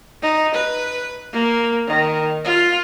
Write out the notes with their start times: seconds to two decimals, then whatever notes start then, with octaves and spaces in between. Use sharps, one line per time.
0.22 D#4
0.54 B4
1.33 A#3
1.87 D#3
2.44 F4